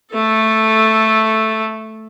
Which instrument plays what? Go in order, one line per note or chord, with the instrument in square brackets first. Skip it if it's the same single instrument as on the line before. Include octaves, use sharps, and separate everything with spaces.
[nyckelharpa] A3 A4